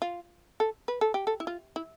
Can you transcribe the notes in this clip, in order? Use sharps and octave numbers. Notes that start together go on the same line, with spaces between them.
F4
A4
B4
A4
G4
A4
E4
F4
E4